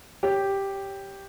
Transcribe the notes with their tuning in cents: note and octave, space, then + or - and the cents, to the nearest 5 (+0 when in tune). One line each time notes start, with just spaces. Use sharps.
G4 +0 C#5 +0